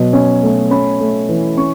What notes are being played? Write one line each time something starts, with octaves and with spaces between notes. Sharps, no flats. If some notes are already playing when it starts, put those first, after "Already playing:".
Already playing: B2 F#3
C#4
A3
C#4 B5
A3
E3
C#4 C#6